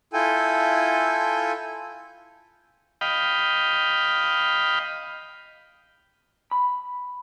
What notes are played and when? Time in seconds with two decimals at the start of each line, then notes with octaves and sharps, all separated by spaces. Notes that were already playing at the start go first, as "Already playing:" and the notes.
0.13 E4 F4 A4 G5 G#5
3.01 D#5 F5 G5 B5
6.51 B5